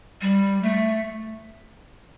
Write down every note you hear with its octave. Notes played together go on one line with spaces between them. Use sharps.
G3
A3